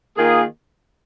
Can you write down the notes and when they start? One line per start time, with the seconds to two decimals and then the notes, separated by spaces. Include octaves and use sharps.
0.17 D#3 A#3 F4 G#4